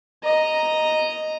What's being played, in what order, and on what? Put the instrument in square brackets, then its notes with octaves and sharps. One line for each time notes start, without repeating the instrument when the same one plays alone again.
[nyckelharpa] D#5 A#5